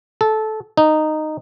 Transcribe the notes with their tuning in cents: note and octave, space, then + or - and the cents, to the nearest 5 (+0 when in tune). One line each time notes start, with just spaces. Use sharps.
A4 -15
D#4 -10